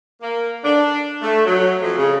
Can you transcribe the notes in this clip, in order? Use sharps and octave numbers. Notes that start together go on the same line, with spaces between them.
A#3
D4
A3
F#3
F2
C#3